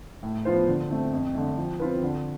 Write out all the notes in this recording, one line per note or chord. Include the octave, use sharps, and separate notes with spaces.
A2
F3 B3 F4 C5
D3
A3 C4
F2
D3 A3
F3
C4 F4 B4
D3